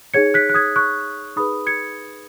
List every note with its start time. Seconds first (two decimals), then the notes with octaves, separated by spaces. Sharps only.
0.14 D#4 G#4 C#5 G#6 C#7
0.34 F#6 B6
0.50 F#6
0.54 D#6 G#6
0.76 C#6 F#6
1.36 D#4 G#4 B4 B5 D#6
1.67 G#6 C#7